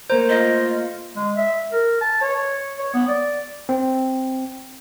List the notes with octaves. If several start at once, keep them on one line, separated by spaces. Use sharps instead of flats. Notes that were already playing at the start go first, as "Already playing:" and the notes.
A3 A#3 A#4 C5
F4 D#5
G#3
E5
A#4
A5
C#5
C#5
B3
D5
C4